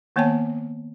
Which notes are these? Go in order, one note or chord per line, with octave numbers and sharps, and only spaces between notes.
D#3 A#3 B3 C#5 G5 A5